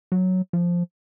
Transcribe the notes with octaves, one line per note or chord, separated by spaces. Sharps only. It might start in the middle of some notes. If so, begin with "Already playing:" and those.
F#3
F3